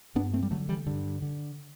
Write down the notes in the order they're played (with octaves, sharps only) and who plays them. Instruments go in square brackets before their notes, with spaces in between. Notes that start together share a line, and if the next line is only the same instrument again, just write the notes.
[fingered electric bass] G2 B3 D4
A3 C4
G3
D3 F#3 A3
E3 G3
G2 D3
D3